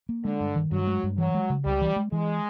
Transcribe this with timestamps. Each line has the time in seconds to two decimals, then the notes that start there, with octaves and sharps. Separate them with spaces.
0.09 A#3
0.25 D3 G#3
0.40 G2
0.56 D#3
0.71 G2 F#3
0.87 G#3
1.03 G2
1.18 E3 F#3
1.34 G#3
1.50 C#3
1.65 C#2 G3
1.81 E3
1.96 G#3
2.12 E3 G#3